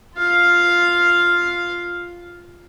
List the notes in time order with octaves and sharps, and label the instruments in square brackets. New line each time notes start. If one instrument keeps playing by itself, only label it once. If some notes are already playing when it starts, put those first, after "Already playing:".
[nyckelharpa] F4 F5